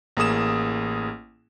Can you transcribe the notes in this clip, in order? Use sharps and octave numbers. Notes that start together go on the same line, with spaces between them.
A1 A#3 G#4 D#6 E7